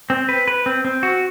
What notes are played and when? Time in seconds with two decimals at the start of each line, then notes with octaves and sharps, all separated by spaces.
0.10 C4
0.29 B4
0.48 B4
0.66 C4
0.85 C4
1.03 F#4